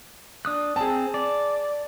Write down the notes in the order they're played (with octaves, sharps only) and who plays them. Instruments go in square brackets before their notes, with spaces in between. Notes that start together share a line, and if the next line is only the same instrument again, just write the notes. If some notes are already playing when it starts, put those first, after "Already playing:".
[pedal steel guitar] D4 D#6 F#6
[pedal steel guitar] C4 [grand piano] G#4 A5
[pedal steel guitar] D5